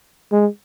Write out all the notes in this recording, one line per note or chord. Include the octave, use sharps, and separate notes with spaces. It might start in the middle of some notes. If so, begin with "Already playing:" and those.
G#3